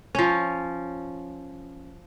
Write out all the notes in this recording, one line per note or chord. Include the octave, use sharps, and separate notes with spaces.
F3 C#4